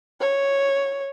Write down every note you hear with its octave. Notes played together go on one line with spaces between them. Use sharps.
C#5